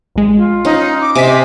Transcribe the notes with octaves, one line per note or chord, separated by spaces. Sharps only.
A#1 G#3
F4
C#4 D#4
D6
C3 C5 D#5 G#5 D6 B6